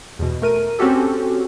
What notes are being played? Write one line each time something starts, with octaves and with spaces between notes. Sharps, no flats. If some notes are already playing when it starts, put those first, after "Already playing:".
E2 B2
A3 A#4 D#7
C4 C#4 F#4 G4 A4